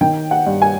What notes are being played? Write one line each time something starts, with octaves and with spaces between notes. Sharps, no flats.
D#3 G5
F#5
G2
G#5